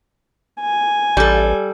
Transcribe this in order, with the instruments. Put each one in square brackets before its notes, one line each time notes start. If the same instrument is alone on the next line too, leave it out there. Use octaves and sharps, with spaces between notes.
[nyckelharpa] G#5
[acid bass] A1 [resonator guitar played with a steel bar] G3 A4